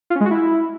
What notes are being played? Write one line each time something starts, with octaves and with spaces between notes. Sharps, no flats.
F4
C#4
G#3
F#4
E4